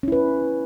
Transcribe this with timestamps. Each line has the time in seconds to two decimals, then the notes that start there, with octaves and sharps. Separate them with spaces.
0.03 C#4
0.08 E4
0.12 B4